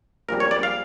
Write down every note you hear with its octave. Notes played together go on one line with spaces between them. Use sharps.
A#1 A#2 G3 D4 A#4
C#5
D5
F5